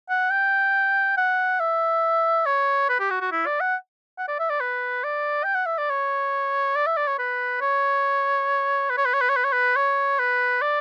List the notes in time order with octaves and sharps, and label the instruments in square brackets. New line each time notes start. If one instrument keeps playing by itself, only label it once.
[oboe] F#5
G5
F#5
E5
C#5
B4
G4
F#4
F#4
E4
D5
F#5
F#5
D5
E5
D5
B4
D5
G5
F#5
E5
D5
C#5
D5
E5
D5
C#5
B4
C#5
B4
C#5
B4
C#5
B4
C#5
B4
C#5
B4
C#5
B4
D5